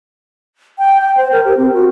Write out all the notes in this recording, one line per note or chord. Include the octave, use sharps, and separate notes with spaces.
G5
G5
C5
A#4
G4
C4
F#4